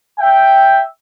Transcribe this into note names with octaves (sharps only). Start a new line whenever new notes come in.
E5 G5